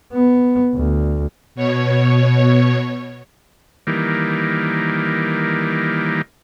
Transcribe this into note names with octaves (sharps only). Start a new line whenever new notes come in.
B3
D2
B2 C#5
D#3 E3 G3 A#3